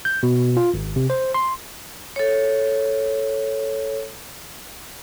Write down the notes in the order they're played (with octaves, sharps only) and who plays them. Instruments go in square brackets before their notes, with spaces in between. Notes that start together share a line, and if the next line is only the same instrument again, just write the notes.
[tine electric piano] G6
B2
F4
G#1
C3
C5
C6
[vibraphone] A4 C#5